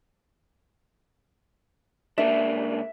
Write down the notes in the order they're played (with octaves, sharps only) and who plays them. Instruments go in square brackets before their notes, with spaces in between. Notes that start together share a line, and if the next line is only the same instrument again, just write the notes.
[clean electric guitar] C#2 A#3 D4 [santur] E5